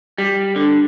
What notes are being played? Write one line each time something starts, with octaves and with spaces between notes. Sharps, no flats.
G3
D3